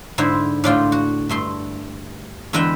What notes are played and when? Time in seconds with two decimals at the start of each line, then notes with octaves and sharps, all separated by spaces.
0.18 G#2 D3 E4 C5
0.64 A2 D4 F4 G5
0.92 F#4
1.29 G2 A3 C6
2.53 E2 D3 G#3 B4 E5 G5